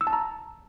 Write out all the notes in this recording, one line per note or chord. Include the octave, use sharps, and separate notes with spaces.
E6
A5
A#5